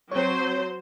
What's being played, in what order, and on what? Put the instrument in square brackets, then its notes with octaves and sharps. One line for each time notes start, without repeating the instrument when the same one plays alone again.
[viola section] F#3 C5 [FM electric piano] C4 C#5